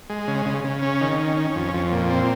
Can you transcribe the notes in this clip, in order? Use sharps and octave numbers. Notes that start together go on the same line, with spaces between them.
G#3
C#3
C#3
C#3
C#4
D#3
C#4
C#4
F2
F2
A#2
C4